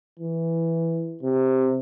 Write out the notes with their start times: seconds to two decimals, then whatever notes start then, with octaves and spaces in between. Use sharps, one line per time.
0.19 E3
1.23 C3